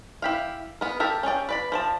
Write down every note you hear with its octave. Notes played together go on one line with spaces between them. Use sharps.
E4 G4 F5
B3 A#4
G4 A4 A#4
C#4 G#4 D5 G5
B4 D5 B5
F3 D5 A5